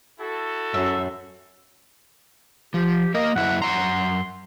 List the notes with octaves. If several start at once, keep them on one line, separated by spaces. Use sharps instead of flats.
E4 F#4 A4
F#2 E5
F3 G4
A#3 A#4 D#5
F#2 E4 F#5
F#2 F#5 A#5 C6